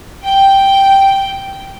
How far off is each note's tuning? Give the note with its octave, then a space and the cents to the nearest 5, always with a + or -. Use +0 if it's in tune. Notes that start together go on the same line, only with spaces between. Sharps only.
G5 -5